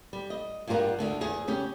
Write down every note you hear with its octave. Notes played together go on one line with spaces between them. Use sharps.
G3
D#5
G2 G3 F4 G4 A#4 F#5
D2 D3 A3
E2 G#4
C#3 C#4 G4